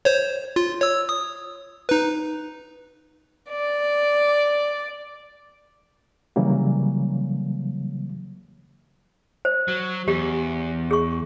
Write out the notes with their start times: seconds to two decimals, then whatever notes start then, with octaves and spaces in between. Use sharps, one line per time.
0.05 C5 C#5
0.56 F4
0.81 C#5 E6
1.09 D#6
1.89 D#4 B4
3.50 D5
6.36 C#3 E3 F#3 G3 A#3
9.45 C5
9.68 F#3
10.08 E2 G4
10.91 G#4 C#6